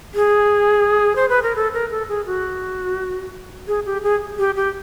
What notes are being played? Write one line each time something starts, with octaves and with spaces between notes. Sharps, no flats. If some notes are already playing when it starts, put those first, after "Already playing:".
G#4
C5
B4
A#4
A4
A#4
A4
G#4
F#4
G#4
G4
G#4
G4
G4